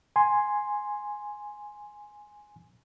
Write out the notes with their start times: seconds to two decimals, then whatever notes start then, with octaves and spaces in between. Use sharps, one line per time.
0.16 G#5 C6